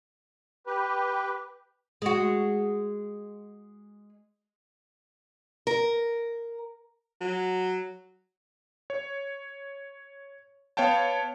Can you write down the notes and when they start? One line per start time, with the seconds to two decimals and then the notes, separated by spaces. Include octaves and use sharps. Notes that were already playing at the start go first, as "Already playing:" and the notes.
0.67 G4 B4
2.02 G#3 F#4
5.67 A#4
7.21 F#3
8.90 C#5
10.77 B3 C#5 F5 G5 A5